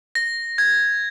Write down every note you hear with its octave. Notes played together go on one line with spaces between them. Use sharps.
A#6
G#6